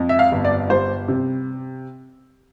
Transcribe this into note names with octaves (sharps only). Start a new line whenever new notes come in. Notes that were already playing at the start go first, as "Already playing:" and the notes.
Already playing: F2
E5
F5
G1
D5
G3 C5
C3